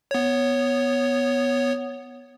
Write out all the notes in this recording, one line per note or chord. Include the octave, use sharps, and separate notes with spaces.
B3 C#5